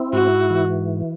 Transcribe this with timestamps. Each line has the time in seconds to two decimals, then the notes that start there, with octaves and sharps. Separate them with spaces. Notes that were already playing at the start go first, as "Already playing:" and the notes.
Already playing: C4 E4
0.13 G#2 F#4
0.50 E3